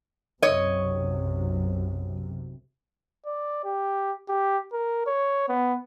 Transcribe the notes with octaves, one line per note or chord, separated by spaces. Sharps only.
B1 F#2 C3 C#5 D#5
D5
G4
G4
A#4
C#5
B3